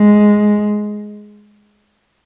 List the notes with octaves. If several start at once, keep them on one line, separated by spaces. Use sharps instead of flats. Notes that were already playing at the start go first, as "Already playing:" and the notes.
Already playing: G#3